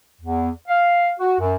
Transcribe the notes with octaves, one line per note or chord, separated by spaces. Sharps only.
E2
F5
F#4
F#2